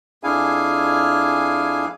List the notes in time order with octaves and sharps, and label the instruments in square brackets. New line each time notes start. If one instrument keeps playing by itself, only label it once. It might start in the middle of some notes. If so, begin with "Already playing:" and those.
[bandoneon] F2 D4 E4 G#4 F5 G#5